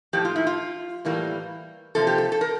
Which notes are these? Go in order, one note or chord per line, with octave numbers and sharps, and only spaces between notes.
A2 F3 A#3 G4
F4
E4
F4
A2 E3 G3 A#3
C3 F3 A#3 A4
G4
A4
A4
A#4